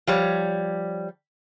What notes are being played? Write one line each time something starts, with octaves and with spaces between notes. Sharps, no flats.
F3 G3 C#5